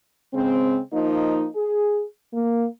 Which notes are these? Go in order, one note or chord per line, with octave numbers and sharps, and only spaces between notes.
C#3 G#3 C4
F3 A#3 D#4
G#4
A#3